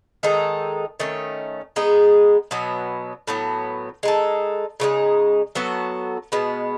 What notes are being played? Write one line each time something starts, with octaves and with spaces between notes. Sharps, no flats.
D#3 G#3 D#4 A4
D#3 A3 C#4
G#3 B3 D#4 G#4
B2 F#3 B3
A2 F#3 B3
G#3 D#4 A4
C#3 E3 G#3 D#4
F#3 B3 F#4 A4
B2 G#3 B3